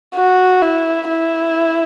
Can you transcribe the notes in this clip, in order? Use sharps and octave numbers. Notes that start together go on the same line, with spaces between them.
F#4
E4
E4